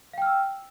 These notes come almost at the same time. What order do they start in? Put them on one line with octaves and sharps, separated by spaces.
F5 G5 F6 E6